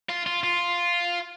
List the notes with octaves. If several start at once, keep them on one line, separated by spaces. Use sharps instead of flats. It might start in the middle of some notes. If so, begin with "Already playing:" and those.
F4
F4
F4